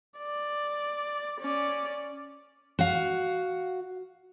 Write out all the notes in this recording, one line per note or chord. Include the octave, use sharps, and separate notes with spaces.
D5
C#4 D5
F#4 F5